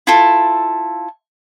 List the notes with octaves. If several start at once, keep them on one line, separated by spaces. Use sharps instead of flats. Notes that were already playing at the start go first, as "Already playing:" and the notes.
E4 F4 A4